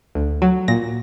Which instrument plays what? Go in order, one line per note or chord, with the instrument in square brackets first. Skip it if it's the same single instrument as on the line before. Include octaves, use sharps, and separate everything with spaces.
[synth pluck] D2
F#3
A#2 A#6